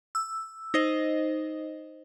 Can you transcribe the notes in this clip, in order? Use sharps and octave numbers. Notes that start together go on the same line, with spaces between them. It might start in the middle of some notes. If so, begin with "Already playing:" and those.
E6
D#4 C5 D#5